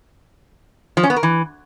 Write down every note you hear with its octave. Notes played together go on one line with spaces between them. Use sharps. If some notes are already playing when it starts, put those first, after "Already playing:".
F3
C#4
B3
A#4
E3